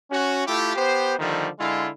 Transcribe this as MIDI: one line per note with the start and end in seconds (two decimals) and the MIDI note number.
0.11 0.43 61
0.11 0.43 66
0.47 0.76 57
0.47 0.76 64
0.47 0.76 65
0.47 0.76 67
0.76 1.15 59
0.76 1.15 67
0.76 1.15 72
1.19 1.49 50
1.19 1.49 51
1.19 1.49 53
1.19 1.49 55
1.19 1.49 57
1.60 1.89 50
1.60 1.89 56
1.60 1.89 64
1.60 1.89 65